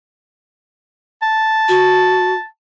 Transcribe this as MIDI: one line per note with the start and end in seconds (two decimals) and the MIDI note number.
1.22 2.45 81
1.68 2.34 66